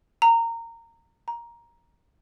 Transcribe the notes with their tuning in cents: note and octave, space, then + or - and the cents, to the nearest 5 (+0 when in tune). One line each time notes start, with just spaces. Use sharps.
A#5 -20
A#5 +10